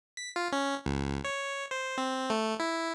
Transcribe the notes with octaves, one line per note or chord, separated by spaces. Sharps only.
B6
F4
C#4
C#2
C#5
C5
C4
A3
E4